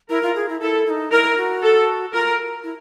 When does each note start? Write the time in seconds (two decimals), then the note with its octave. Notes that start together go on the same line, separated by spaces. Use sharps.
0.10 E4 A#4
0.23 F4
0.35 G#4
0.49 E4
0.61 E4 A4
0.86 E4
0.90 D#4
1.12 E4 A#4
1.37 F#4
1.63 A4
2.13 F4 A#4
2.64 E4